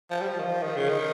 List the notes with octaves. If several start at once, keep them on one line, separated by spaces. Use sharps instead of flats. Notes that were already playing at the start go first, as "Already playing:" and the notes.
F3
G3
F3
D#3
F3
D#3
C#3
D#3